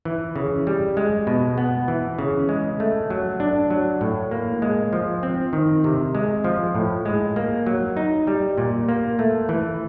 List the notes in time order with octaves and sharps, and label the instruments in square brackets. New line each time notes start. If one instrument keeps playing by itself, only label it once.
[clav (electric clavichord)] E3
C#3
G3
G#3
B2
B3
E3
C#3
G#3
A3
F#3
D4
F#3
A2
A#3
G#3
F3
C4
D#3
C3
G#3
F3
A2
G#3
A#3
F#3
D#4
G3
A#2
A#3
A3
E3